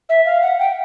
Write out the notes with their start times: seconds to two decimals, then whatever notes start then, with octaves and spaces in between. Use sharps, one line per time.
0.09 E5
0.25 F5
0.42 F#5
0.59 G5